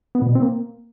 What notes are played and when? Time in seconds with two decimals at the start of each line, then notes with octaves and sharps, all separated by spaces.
0.15 B3
0.22 A#2
0.29 B2
0.35 C4
0.42 A#3